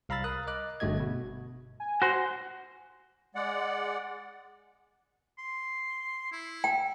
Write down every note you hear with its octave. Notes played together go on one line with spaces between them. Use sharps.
C2 F5 A#5 B5 E6 A6
A#4 D#6 F#6
D#5 D6 F#6
G1 G2 A3 F#4 D#5 G#6
B2
G#5
F#4 C5
G#3 D5 F#5
C6
E4
G5